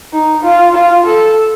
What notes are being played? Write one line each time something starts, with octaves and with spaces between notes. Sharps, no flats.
D#4
F4
F4
A4